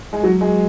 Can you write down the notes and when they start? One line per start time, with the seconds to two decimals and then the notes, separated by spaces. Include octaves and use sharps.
0.13 G#3
0.23 F#3
0.41 G#3